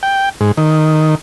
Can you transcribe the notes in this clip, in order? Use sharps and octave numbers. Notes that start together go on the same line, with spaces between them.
G5
G#2
D#3